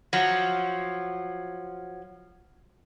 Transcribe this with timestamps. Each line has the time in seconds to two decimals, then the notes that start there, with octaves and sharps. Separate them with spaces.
0.13 F3 F#3